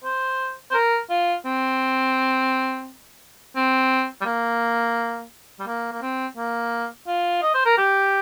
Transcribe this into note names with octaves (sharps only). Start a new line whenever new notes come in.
C5
C5
A#4
F4
C4
C4
G3
A#3
G3
A#3
A#3
C4
A#3
F4
D#5
C5
A#4
G4